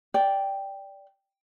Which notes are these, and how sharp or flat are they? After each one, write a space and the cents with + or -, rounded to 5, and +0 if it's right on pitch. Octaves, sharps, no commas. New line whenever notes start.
D5 -10 G5 +0